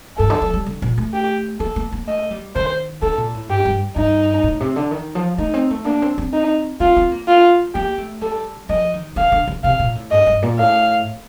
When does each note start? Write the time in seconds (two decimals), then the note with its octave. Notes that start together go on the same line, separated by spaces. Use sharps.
0.18 G2 A4
0.30 D3
0.42 F3
0.54 G3
0.66 D3
0.82 A#2
0.98 A3
1.14 G4
1.60 A#3 A4
1.76 A#3
1.93 A#3
2.07 A3 D#5
2.31 G3
2.55 D#3 C5
3.02 D3 A4
3.17 A#2
3.34 A2
3.49 G2 G4
3.65 G2
3.96 G2 D#4
4.44 A2
4.60 C3
4.76 D3
4.91 D#3
5.15 F3
5.38 A3 D#4
5.54 C4
5.71 A3
5.85 A#3 D4
6.02 C4
6.18 C4
6.33 D#4
6.80 C4 F4
6.97 C4
7.12 A#3
7.28 F4
7.74 A#3 G4
7.98 A3
8.22 G3 A4
8.69 F3 D#5
8.94 D#3
9.16 D3 F5
9.32 D3
9.48 D3
9.64 C3 F5
9.80 A#2
9.95 A2
10.11 G2 D#5
10.26 G2
10.42 A#2
10.59 A2 F5